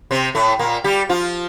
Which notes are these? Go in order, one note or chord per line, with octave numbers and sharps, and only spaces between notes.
C3 C4
A2 A3
A#2 A#3
G3 G4
F3 F4